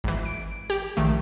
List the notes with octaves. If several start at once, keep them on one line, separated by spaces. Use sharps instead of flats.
G#1 E3
D7
G4
A#1 D#3 A3